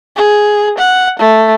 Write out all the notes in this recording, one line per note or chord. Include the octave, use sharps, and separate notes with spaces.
G#4
F#5
A3